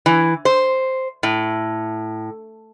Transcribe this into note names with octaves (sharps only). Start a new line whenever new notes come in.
E3
C5
A2